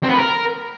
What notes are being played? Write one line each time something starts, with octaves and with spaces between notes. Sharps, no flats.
C4
B3
B4
A#4